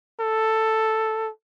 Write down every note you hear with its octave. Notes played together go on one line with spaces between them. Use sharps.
A4